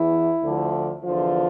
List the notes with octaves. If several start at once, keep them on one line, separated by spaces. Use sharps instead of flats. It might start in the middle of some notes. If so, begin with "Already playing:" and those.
Already playing: E2 E3 E4
D2 D3 F3
E2 D3 F3 F4